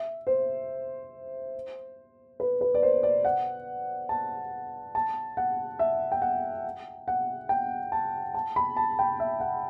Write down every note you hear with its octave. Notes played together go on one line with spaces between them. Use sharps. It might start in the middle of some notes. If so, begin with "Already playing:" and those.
Already playing: E5
C5
B4
B4
D5
C5
D5
F#5
A5
A5
F#5
E5
G5
F#5
F#5
G5
A5
A5
B5
A5
G5
E5
F#5